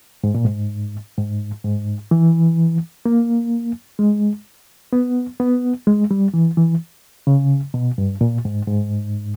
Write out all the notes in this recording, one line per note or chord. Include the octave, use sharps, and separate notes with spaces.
G#2
A#2
G#2
G#2
G#2
E3
A#3
G#3
B3
B3
G#3
G3
E3
E3
C#3
B2
G2
A#2
G#2
G#2